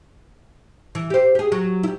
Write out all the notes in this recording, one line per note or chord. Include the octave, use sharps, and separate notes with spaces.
E3
G4 C5
G4 G#4
F#3
G3 E4